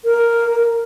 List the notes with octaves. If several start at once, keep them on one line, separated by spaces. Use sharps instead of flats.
A#4